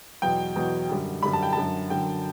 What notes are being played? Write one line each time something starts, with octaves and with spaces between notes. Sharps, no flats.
E2 B2 F#3 G5
E2 B2 F#3
F#2 D3 G3
F#2 D3 G3 B5
A5
G5
F#2 D3 F#3 A5
F#2 D3 F#3 G5